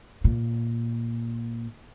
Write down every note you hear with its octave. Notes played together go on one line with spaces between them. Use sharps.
A#2